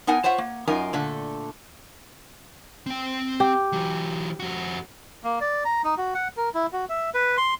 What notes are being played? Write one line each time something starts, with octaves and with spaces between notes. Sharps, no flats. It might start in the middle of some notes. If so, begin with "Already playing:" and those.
B3 D#4 A#4 F#5 G#5
F4 C5 C#5 E5 F#5
A#3
F#2 D#4 F4 A#4 G#5
A#2 D3 A3
C4 G5
G4
E3 F#3
F2 F#4
A#3
D5
A#5
D#4
F#4
F#5
A#4
E4
F#4
E5
B4
C6